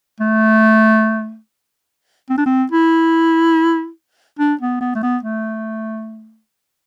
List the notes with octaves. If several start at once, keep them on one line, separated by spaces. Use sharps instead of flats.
A3
C4
D4
C4
E4
D4
B3
B3
A3
B3
A3